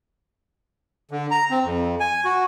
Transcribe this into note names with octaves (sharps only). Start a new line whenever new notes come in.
D3
A#5
C4
F2
G#5
F#4